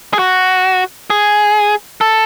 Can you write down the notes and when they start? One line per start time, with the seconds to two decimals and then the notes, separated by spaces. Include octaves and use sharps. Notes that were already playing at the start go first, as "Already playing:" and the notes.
0.13 G#4
0.19 F#4
1.10 G#4
2.01 A4